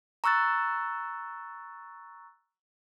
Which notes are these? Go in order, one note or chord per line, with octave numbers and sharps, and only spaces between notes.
A#5 C#6 E6 F#6 A6